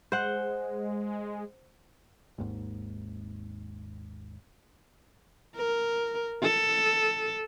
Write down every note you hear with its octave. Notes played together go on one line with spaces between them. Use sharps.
G#3 C5 F#5
G#1 D#2 G#2
A#4
A4